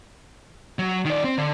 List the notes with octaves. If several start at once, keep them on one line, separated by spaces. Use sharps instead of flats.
F#3
D#3 D5
C4
D3